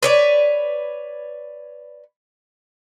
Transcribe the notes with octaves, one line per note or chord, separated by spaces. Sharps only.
B4 C#5 D5